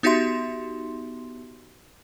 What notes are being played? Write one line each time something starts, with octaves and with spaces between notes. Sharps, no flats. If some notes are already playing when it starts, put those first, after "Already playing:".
B3 D#4 F#4 G4 E5 C6